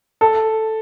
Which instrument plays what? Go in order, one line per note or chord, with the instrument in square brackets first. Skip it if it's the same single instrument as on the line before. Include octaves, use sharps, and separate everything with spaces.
[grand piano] A4